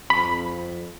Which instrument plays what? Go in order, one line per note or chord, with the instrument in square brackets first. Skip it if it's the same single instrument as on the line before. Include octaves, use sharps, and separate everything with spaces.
[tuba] F2 [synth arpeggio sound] B5